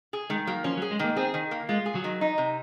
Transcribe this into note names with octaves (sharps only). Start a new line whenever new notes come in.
G#4
D#3 G#3
F#3 A#3
F3 C#4
F#3
G#4
G#3
D#3 A#3
C4 G#4
D#3
A#3
G#3 F4
G#4
F#3
D#3
D#4
C3